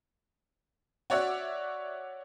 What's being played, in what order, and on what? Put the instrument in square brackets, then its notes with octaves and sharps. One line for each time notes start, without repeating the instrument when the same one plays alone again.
[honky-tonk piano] F#4 C#5 D5 E5 F#5